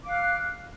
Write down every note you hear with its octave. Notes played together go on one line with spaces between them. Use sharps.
F5 D6 F6 F#6